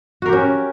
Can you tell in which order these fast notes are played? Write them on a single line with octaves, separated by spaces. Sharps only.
F#4 A#4 G4 C#4